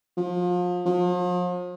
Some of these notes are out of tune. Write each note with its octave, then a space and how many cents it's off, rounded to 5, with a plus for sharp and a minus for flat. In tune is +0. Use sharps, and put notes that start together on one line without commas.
F3 +35
F3 +40